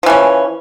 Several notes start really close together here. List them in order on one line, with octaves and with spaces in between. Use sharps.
F3 E3 C#4